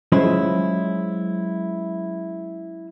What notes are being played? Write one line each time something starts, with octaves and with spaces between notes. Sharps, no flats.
F#3 G#3 C#4 E4 F4 C5